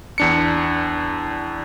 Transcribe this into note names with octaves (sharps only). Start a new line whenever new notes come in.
E2 D4 C#7